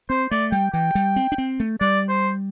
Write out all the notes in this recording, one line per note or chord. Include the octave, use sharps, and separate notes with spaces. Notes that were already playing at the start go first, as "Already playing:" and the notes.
C4 C5
A3 D5
G3 G5
E3 G5
G3
C4
D4
C4
A3
G3 D5
C5